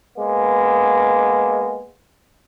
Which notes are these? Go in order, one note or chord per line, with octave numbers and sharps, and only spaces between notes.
G#3 A#3 B3